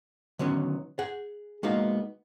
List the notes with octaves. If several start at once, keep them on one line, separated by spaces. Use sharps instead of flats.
D3 D#3 F#3 B3 C#4
G#4 F#5
G#3 A#3 B3 D#4 F#4 F5